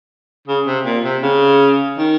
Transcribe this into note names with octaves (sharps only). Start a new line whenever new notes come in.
C#3
C3
A#2
C3
C#3
D#3